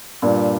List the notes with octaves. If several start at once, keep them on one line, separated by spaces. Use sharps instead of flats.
G2 A#2